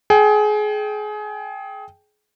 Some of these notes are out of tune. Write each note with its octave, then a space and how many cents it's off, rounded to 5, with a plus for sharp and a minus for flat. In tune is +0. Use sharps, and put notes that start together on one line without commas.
G#4 +25 G5 +0